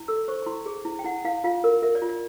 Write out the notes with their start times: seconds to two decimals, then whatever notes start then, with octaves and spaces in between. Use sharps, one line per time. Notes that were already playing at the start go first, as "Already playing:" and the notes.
Already playing: E4
0.08 A4 E6
0.28 C5 C#6
0.42 C#6
0.46 E4 C6
0.66 G#4
0.85 E4
0.99 G5
1.05 E4 F#5
1.25 E4 F5
1.44 F4 F5
1.64 A#4
1.83 A#4 E5
1.95 D5
2.02 F4
2.09 D5